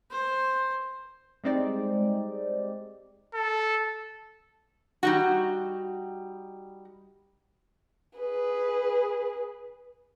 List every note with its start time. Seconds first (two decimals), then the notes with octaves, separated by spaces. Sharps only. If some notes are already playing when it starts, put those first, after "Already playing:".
0.11 C5
1.44 G3 G#3 C4 D#4 D5
3.34 A4
5.03 G3 D#4 F#4
8.18 G#4 B4